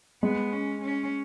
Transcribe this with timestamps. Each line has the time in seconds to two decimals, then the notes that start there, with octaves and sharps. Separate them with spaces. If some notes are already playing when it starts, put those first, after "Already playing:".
0.23 G#3 B3
0.52 C#4
0.82 C#4